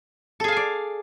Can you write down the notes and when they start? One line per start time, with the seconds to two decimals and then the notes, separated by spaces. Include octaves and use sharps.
0.40 A4
0.44 G#4
0.48 F5
0.52 G#5
0.57 D5